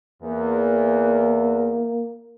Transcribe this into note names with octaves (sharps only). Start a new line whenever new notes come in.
E2 A#3